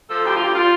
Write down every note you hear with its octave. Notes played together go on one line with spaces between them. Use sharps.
F3 A4
D2 G4
F4
D2 G4
G3 F4